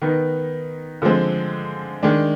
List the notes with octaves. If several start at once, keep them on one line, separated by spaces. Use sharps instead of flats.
D#3 B3 D#4
D3 F3 G#3 C4
D#3 G#3 D4